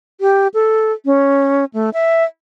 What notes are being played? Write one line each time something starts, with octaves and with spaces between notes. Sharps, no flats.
G4
A4
C#4
A3
E5